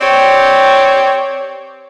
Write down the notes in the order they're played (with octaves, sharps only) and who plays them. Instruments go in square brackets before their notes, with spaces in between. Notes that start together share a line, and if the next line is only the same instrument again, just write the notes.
[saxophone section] C4 G4 C#5 D5